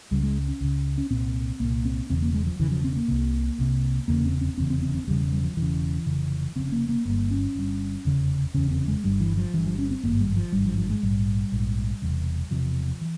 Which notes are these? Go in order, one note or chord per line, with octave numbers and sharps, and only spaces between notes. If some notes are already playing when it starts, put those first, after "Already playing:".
C#2 C#3 G3
G#3
C#4
C#2 C#3
C#4
C2 A#2 C4
C2 A#2 A#3
C4
E1 E2 C#3 C4
A#3
G#3
F3
E1 E2 C#3 E3
F3
C4
A#3
C2 C3
C2 C3
F1 E2 C#3 A#3
C4
C4
F1 E2 C#3 C4
C4
C4
C4
E1 E2 C#3 G3
G3
F3
E1 E2 C#3 E3
F1 F2 C#3
F1 F2 C#3 C4
A#3
A#3
G1 G2 A#3
C#4
G1 G2
F1 E2 C#3
F1 E2 C#3 C#4
C4
G#3
G1 G2 G3
E3
F3
G1 G2 E3
F3
C#4
C4
G#1 G2 A#3
G3
F3
G#1 G2 G3
F3
F3
G#3
A#1 G#2 G3
A#1 G#2
E1 E2 C3
E1 E2 C3 F3
E3